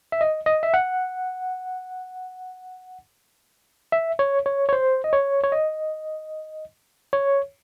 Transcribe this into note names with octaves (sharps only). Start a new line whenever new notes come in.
E5
D#5
D#5
E5
F#5
E5
C#5
C#5
C#5
C5
D#5
C#5
C#5
D#5
C#5